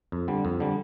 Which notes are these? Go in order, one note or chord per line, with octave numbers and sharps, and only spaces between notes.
F2
D3 G3
F2
D3 G3